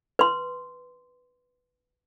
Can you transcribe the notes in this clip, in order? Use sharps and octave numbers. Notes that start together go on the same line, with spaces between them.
B4 C6